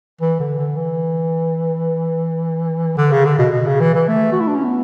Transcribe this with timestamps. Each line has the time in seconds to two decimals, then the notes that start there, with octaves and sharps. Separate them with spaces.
0.21 E3
0.40 D3
0.59 D3
0.76 E3
2.97 D3
3.12 C#3
3.25 D3
3.39 B2
3.52 B2
3.67 C#3
3.80 E3
3.94 E3
4.08 A3
4.33 F#4
4.40 E4
4.48 D4
4.55 C#4
4.64 B3